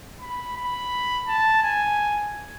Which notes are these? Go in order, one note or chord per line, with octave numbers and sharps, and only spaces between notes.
B5
B5
A5
G#5